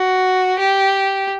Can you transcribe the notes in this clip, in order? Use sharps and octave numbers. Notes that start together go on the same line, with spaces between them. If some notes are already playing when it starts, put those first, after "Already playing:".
Already playing: F#4
G4